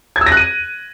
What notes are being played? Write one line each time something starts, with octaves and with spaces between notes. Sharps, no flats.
G#6
E6
A#6
F#6
D#7